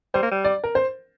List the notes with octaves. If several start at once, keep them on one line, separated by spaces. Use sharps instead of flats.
G3 C5
A#3
G3
D5
A#4
C5